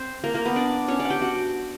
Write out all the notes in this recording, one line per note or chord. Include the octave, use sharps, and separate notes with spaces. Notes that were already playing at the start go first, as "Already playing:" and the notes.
Already playing: C4 C5
A#3 A#4
A#3 A#4
B3 B4
D4 D5
C#4 C#5
D4 D5
F#5
G4 G5
F#4 F#5